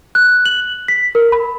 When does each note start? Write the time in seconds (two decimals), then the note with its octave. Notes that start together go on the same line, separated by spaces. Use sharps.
0.15 F#6
0.46 F#7
0.88 B6
1.15 A#4
1.32 B5